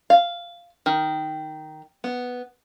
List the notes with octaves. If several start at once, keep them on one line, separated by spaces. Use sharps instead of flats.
F5
D#3
B3